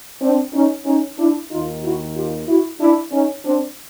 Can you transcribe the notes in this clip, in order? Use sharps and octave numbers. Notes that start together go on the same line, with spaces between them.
C4 D4
C#4 D#4
C#4 D#4
D4 E4
D#2 D#3 D#4 F4
E4 F#4
F4 G4
E4 F#4
D4 E4
C#4 D#4
C4 D4